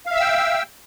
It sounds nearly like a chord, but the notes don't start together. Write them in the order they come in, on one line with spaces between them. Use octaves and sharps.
F5 E5 E6 G5